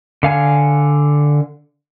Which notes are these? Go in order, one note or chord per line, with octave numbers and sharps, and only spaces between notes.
D3 F5 G#5